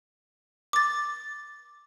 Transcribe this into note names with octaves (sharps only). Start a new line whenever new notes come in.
D6 A6